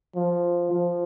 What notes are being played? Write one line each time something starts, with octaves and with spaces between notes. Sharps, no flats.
F3
F3